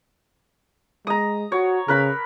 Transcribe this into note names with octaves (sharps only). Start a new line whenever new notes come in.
G#3 A#5 D#6
F#4 C#5
C#3 A#4 B4 B5